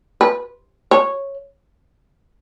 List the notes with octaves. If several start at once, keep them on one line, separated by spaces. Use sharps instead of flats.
B4
C#5